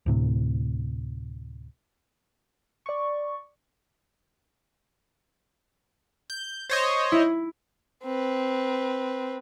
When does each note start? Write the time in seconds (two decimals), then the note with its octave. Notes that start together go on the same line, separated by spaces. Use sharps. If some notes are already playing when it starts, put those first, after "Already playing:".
0.06 D2 A2 C3
2.86 D5 C#6
6.30 G6
6.69 C5 C#5 D#5
7.12 E4
8.03 C4 B4